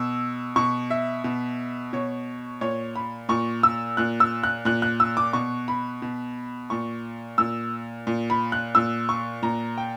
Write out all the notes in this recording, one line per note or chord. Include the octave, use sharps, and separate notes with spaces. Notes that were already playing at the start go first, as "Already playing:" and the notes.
Already playing: B2 E6
B2 C#6
E5
B2
B2 C#5
A#2 C#5
B5
A#2 C#6
E6
A#2 F#6
E6
F#6
A#2 F#6
F#6
E6
D6
B2 C#6
B5
B2
A#2 C#6
A#2 E6
A#2
B5
F#6
A#2 E6
C#6
A#2 A#5
G5